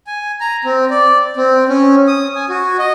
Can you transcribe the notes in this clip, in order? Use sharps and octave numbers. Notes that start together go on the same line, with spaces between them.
G#5
A#5
C4
D5
C4
C#4
D#6
G#5
F#4
D#5